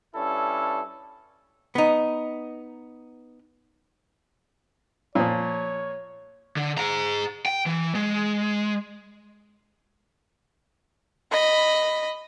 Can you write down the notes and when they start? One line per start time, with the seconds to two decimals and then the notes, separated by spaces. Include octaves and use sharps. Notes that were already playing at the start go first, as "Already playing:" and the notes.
0.15 G2 C#4 E4 A4
1.75 B3 D#4
5.15 A#2 F3 C#5
6.57 D3
6.78 G#4 A#5
7.46 G5
7.66 E3
7.95 G#3
11.32 D#5 B5